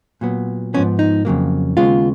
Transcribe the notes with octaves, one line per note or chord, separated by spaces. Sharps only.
A#2 F#3 B3
G#2 F3 B3 C#4
D#4
F2 C#3 F#3 A#3
D#2 C#3 G#3 B3 F4